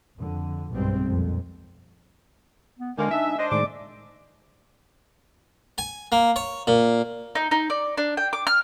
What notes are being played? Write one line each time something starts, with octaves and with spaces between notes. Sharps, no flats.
F2 D3
B1 G2 B2 G3 G#3 C4
F2 A#2
B3
D2 D3 D#3 G#3 A#3 G#5
D4 D#4 E5
D4 C5 D#5
A2 D#3 G#3 D5 D6
G#5
A#3
C#5
A#2
D#4
D#4
D5
D4
G5
D6
F6